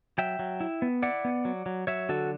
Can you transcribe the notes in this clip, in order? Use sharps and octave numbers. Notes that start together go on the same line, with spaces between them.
F#3 E5 G5
F#3
E4
B3
E4 D5 F#5
B3
F#3
F#3
F#3 C#5 E5
D3 F#4 A4